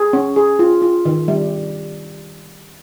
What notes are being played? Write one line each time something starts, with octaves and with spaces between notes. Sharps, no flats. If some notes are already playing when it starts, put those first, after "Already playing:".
Already playing: G#4
C#4
G#4
F4
F4
D#3
G3